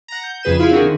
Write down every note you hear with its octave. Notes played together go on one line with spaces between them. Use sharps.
F#5 A#5
G6
F2 C#3 G#4 B4 D#7 E7
E4 F4 G#4 F5 B5
C4 D4 F#4 G#4 A#4
D3 D#3